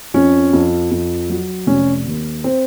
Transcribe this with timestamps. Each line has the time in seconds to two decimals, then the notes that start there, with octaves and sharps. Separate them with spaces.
0.14 F2 C#4
0.53 F2
0.91 F2
1.29 F#3
1.67 F1 C#4
2.06 D#2
2.44 C4